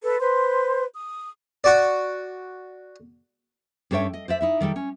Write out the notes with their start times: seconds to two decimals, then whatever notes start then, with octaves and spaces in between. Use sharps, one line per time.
0.03 A4 B4
0.19 B4 C5 C6
0.92 D#6
1.64 F#4 D5
3.91 G2 C#4 A4 C#5 E5 G5
4.13 D#5
4.28 C5 D5 E5
4.41 D#4 E4 E5
4.61 D#3 G3 A4 G5
4.76 C#4